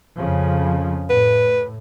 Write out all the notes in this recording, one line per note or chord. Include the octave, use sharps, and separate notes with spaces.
F2 C#3 F3
A2 B4